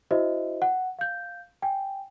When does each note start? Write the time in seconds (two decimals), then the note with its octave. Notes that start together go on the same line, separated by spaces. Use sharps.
0.11 E4 F#4 C5 D#5 E5
0.62 F#5
0.99 F5 G6
1.62 G5 G#5